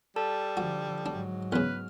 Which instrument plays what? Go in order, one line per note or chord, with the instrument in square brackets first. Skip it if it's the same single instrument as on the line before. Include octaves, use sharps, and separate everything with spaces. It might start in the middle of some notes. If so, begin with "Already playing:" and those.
[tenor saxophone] G3 [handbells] A4 A5
[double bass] D3 F3 [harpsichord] F#4
[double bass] G#2 F#3 [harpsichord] D4
[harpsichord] E2 C#3 [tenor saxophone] B4 [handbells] F6